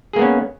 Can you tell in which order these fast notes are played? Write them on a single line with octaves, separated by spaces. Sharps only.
G#4 A#3 B3 C#4